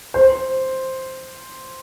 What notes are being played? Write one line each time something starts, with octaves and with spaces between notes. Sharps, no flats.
C5